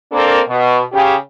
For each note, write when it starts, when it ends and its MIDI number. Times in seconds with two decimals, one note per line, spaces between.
0.12 0.40 58
0.12 0.40 60
0.12 0.40 62
0.12 0.40 69
0.12 0.40 70
0.48 0.80 47
0.91 1.14 49
0.91 1.14 67